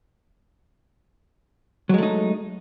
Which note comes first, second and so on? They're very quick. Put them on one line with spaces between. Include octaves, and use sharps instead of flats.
F#3 G#3 A3 D#4